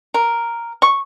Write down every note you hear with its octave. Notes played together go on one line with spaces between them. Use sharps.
A#4
C#6